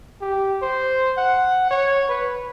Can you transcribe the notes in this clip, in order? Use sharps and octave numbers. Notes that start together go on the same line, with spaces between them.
G4
C5
F#5
C#5
B4